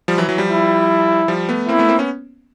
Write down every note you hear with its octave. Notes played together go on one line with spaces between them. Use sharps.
F3 G3
E3 F#3
E3 F#3
F3 G3
E4
F3 G3
A3 B3
A#3 C4 E4
A3 B3
A#3 C4
B3 C#4